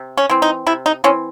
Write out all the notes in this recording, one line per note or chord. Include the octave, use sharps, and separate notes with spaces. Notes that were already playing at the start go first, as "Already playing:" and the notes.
Already playing: C3
C#4
E3 C4
D#4
C3 E4
D#4
E3 C4 C#4